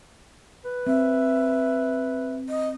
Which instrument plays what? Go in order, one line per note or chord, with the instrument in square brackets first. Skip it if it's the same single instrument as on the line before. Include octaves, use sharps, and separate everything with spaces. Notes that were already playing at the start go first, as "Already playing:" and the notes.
[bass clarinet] B4
[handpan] C4 [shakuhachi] E5
[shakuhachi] D#5